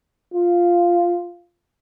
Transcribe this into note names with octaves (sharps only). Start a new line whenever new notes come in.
F4